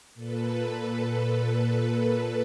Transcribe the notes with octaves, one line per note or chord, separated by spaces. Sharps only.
A#2 A4 B4